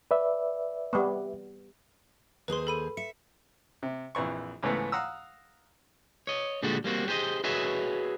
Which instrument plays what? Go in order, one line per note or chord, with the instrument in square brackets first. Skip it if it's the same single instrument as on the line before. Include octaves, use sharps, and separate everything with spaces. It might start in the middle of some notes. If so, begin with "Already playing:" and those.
[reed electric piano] B4 D5 E5
[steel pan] G3 B3
[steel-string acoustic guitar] D#2 G#4 C5 [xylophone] B4 C6
[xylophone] A4 B5 D#7
[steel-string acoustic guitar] E5 [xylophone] C#7
[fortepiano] C3
A#1 F2 E3 C#6
C#2 G#2 E3 A3 B3
F5 F#5 A#5 D#6 E6
[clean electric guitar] C#5 D#5
A#2 D3 G3 G#3 D4 F#4
G3 A#3 C4 F#4
G4 G#4 C5 C#5 D#5
F#4 G#4 B4 C#5 D#5 E5